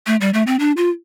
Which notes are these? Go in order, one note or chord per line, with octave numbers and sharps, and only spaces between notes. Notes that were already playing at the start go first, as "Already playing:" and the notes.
A3
G3
A3
C4
D4
F4